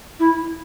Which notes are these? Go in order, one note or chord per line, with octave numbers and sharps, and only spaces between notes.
E4